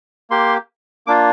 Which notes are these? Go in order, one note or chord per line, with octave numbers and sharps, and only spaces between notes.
A#3 G4 C6
A#3 D4 F4 D6